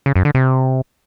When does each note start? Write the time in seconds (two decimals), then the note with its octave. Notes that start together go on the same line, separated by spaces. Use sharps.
0.06 C#3
0.16 F#2
0.25 D3
0.35 C3